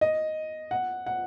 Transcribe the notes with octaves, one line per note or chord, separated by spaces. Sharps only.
D#5
F#5
F#5